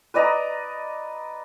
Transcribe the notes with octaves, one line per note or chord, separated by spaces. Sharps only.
B4 D5 D#5 A#5